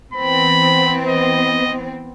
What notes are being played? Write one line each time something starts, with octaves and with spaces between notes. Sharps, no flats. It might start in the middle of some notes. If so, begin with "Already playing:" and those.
E3 B3 C4 B5
D#5